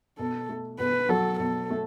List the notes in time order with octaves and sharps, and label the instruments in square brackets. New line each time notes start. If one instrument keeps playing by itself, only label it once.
[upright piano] B2 [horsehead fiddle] A4
[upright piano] A3
[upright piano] B2 [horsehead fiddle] B4
[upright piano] F#3 [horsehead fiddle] A4
[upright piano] B2 [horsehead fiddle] A4
[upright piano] A3